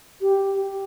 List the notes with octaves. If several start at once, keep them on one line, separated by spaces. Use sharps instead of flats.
G4